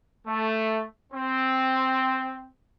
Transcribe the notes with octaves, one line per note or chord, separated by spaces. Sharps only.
A3
C4